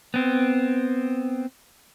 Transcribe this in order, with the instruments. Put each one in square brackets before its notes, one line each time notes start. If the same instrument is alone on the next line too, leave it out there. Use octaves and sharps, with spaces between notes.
[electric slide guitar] B3 C4